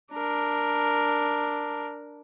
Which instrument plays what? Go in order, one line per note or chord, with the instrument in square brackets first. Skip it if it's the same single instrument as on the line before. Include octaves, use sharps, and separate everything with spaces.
[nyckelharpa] D4 A#4